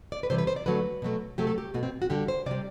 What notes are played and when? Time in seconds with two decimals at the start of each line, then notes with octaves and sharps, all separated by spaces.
0.12 D5
0.23 B4
0.30 C3 E3 G3 C5
0.38 B4
0.47 C5
0.56 D5
0.66 D3 F#3 A3 B4
1.02 B2 F#3 A3
1.38 C3 F#3 A3 G4
1.47 A4
1.58 G4
1.74 B2 A3 F#4
1.83 C4
2.02 F#4
2.10 D3 G3 G4
2.28 C5
2.46 C3 G3 D5